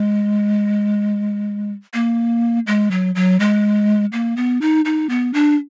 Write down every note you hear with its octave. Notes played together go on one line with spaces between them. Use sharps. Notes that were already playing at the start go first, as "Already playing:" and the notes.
Already playing: G#3
A#3
G#3
F#3
F#3
G#3
A#3
B3
D#4
D#4
B3
D4